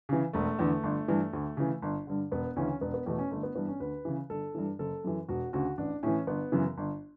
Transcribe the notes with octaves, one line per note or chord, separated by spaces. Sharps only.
C#3 E3
E1 A3
E2 D3
G1
G2 E3
D2
C#3 E3
G1
G2 D3
E1 B3
D2 C#3 E3 C#4
E1 B3
B3
E2 B2 A3
C#4
G1 A3
B3
G2 E3 B3
C#4
D2 B4
C#3 E3
G1 A4
G2 E3
F#1 A4
F#2 E3
E1 F#4
D2 C#3 F#4
A1 D4
A2 E3 C#4
G1 B3
F#2 C#3 E3
G1